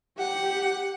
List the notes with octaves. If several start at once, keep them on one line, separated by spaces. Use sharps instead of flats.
G4 F#5